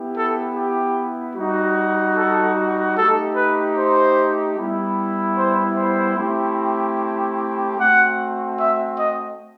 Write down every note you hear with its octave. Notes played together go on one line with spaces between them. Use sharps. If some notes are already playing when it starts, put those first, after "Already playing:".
Already playing: B3 E4 G4
A4
G4
G3 D#4 F#4
A4
A3 D#4 G4 A4
B4
C5
G3 B3 E4
C5
C5
A3 C4 E4 G4
A3 C4 F#4 F#5
E5
D#5